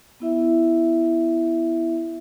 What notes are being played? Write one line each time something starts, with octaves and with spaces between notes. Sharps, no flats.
B3 E4 E5